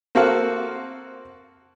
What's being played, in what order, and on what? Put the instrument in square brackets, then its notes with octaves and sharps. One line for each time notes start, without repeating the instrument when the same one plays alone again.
[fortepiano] A#3 C4 F#4 A4 F5 F#5